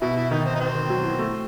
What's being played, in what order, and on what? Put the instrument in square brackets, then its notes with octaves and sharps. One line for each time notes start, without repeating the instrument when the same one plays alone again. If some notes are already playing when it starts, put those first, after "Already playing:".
[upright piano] B2 [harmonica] E4
[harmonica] E4
[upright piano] D#3 [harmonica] D#4
[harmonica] C4
D#4
C4
[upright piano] D#3
F#3
E3
A3